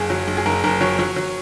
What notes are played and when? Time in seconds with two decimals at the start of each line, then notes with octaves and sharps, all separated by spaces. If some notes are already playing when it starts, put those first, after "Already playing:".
Already playing: F#1 G#4
0.10 F#3
0.28 F#1
0.37 G#4
0.46 F#1 A#4
0.64 F#1 A#4
0.81 F#3 C#5
0.99 F#3 C#5
1.16 F#3